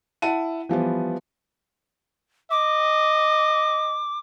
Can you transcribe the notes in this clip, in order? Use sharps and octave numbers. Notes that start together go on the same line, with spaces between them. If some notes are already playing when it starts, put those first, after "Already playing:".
E4 F#5 A5 D#7
E3 F3 G3 B3
D#5 D6